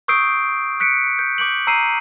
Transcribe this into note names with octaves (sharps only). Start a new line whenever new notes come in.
C#6 D#6 E6 G6 C7 D7
F#6 B6 C#7 D7
G6
D6 G6 D7 F#7
A#5 E6 C7 D#7